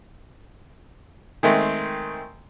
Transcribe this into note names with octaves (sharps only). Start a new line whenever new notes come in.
D#3 G#3 A3 C4